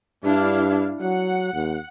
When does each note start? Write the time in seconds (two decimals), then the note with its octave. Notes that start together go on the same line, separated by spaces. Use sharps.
0.24 G2 D4 E4 F5
1.01 F#3 F#5
1.54 D#2